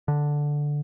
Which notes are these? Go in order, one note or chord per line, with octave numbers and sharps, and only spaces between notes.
D3